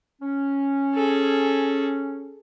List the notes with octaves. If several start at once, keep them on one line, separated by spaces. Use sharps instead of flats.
C#4
G#4 A4